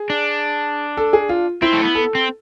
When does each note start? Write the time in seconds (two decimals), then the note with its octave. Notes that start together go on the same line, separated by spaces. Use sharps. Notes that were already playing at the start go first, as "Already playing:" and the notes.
Already playing: G#4
0.10 D4
0.97 A4
1.13 G#4
1.29 F4
1.62 C4 E4
1.73 A3
1.84 B3
1.95 A4
2.15 C4